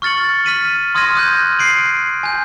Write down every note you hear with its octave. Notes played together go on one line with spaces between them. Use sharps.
C#6 F6 A6 C#7 F#7
F6 B6 D#7 F#7
C6 D#6 F6 G#6 A#6 D#7
D#6 F#6 G6
C7 D7 F#7
G#5 G6